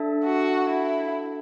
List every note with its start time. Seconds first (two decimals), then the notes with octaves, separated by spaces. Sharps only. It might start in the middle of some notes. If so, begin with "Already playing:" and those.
Already playing: D4 A4 E5 A5
0.25 F#4
0.69 E4